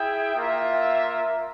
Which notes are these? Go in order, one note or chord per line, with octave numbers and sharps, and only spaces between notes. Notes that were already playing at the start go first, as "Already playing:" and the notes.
Already playing: E4 G#4 E5 G5
A#3 F4 A#4 E5